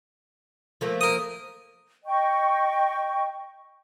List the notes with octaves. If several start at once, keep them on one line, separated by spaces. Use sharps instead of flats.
F3 A3 A#3
A#4 D#6
D#5 G5 C#6